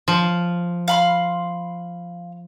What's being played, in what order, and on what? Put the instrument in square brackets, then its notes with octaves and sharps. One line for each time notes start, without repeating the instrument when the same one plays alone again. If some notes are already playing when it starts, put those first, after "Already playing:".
[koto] F3
[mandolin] F5 B5 C6